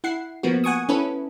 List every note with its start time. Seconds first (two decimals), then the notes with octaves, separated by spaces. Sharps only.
0.04 E4 F#5 C7
0.43 F3 A#3 B3 F#4
0.64 F#5 G#5 C#6 D#6
0.89 C#4 E4 A4 B4